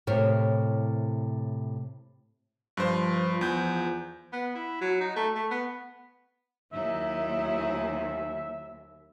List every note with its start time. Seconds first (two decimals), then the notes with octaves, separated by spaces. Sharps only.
0.07 A2 C3 E4 A#4 C#5
2.77 G2 F3 C5
3.41 E2 G6
4.33 B3
4.55 E4
4.81 F#3
5.01 D#4
5.16 A3
5.35 A3
5.51 B3
6.73 D#2 F#3 D#4 E4 E5